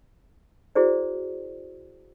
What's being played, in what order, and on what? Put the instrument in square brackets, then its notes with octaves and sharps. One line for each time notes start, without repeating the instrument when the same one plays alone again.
[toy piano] E4 F#4 G#4 C5 D5